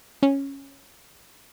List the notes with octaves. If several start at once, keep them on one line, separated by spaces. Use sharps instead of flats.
C#4